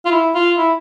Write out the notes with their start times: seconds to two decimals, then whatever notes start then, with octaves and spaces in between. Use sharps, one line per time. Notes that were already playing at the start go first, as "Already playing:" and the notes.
0.05 F4
0.11 E4
0.34 F4
0.58 E4